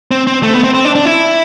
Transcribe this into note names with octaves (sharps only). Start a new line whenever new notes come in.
C4
C4
A3
B3
C4
C4
D4
D4
E4